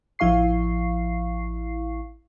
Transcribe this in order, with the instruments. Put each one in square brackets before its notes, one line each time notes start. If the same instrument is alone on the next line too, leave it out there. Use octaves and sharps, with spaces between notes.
[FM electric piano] A1 F3 E4 F5 C#6 C7